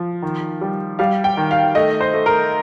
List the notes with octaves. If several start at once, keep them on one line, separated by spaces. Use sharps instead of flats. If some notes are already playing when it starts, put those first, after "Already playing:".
Already playing: F3
D#3
G3
G3 F5
G5
D#3
F5
A3 D#5
C5
A3
A#4